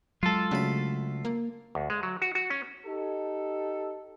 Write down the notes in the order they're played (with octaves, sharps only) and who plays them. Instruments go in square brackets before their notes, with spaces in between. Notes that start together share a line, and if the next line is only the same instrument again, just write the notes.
[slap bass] F#3 G#3 [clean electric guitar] F4 A4
[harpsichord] D2 B5 [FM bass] C#3
[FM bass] A#3
[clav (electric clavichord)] D2
G#3
F#3
F#4
F#4
C#4
[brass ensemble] D#4 G4 A4